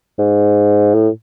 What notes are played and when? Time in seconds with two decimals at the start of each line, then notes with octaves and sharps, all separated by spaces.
0.19 G#2
0.94 A2